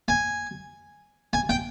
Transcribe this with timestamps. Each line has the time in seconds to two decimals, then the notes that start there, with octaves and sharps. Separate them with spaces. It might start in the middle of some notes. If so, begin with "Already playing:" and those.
0.08 G#5
1.33 G#5
1.49 G5